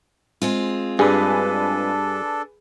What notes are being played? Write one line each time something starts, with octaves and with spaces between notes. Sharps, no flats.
G#3 C4 F4
G2 D4 G#4 A4 B4